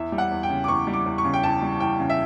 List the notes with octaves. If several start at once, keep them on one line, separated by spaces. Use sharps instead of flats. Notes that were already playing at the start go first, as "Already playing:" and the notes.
Already playing: E2 E5
G3
F#5
E2
G5
C#3
D6
E2 C#6
G3
D6
E2
C#6
C#3
G5
E2 A5
G3
E2 G5
C#3
E5